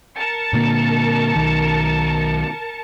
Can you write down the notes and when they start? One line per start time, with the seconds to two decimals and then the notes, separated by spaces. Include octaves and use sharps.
0.17 A#4 A5 C#7
0.53 A#2 D3 A#3
1.36 B1 D#3